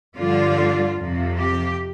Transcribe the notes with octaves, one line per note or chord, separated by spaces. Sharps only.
G2 D3 F3 D4 F4
F2 C3 F3
G4